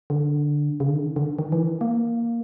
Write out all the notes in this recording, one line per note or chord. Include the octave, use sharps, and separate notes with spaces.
D3
C#3
D3
D#3
D3
D#3
E3
A#3